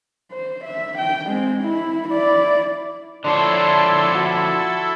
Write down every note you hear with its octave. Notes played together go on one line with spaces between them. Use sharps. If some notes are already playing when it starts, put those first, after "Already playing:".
C5
E5
G5
G#3 C4
E4
E4 D5
D3 F3 D4 E4 A4 C#5 C6
F#4